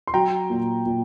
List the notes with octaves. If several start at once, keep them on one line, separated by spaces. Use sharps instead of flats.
C6
F#3 G5 A#5
A#2
A#2